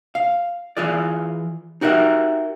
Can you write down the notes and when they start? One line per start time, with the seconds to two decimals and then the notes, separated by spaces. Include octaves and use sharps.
0.15 F5
0.77 E3 E4 F4 G#4 D5
1.81 D#4 F#4 G4 A#4 E5